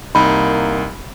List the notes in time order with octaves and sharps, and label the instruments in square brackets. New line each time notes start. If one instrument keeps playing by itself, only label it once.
[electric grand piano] C2 D#4 [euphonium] A#3 [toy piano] B5